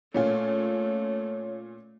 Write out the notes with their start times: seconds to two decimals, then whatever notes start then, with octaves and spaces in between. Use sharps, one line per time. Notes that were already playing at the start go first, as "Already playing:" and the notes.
0.14 A#2 A3 C#4 F4 C#5